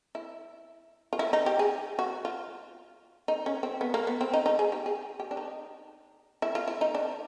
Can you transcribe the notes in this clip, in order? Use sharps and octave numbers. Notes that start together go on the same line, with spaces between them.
E4
F4
E4
D#4
G4
G#4
F#4
F4
D#4
C#4
C4
B3
A#3
B3
C4
D#4
D#4
G#4
G4
G#4
G4
D4
D#4
E4
F4
E4
D#4
D4